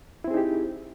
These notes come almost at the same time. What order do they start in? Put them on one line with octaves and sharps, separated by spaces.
E4 C4 G#4 D#4 G4